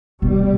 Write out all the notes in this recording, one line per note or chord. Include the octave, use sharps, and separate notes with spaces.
B2 G3